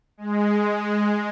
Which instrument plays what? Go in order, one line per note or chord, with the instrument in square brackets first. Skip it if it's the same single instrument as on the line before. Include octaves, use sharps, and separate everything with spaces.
[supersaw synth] G#3